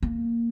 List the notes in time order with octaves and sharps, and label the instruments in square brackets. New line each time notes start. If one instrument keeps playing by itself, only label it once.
[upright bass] A#3